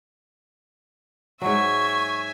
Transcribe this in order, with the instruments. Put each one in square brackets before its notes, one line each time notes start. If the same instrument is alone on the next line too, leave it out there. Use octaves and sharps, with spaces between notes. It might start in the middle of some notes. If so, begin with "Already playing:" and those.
[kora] G#2 F#3 [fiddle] E5 G#5 [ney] C#6